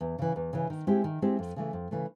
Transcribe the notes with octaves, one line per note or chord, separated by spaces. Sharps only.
E2
C#3 E3
E2
C#3 E3
D#3
G#3 C4 E4 G4
D#3
G#3 C4 E4 G4
F2
C#3 E3 A3
F2
C#3 E3 A3